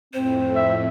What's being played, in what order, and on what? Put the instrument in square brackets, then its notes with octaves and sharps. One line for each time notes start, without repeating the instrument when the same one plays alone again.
[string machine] F2 A2 [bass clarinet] C4 [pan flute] C5
[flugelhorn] E5